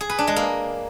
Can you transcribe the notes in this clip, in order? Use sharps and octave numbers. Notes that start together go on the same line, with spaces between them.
G#4
B4
D4
G#3
A#3